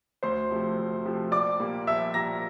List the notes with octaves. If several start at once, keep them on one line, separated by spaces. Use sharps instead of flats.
D2 C5 C6
C3 F3 A3
D2
C3 F3 A3
A#1 D5 D6
A#2 G3 A#3
A#1 E5 E6
A#2 G3 A#3 A#5 A#6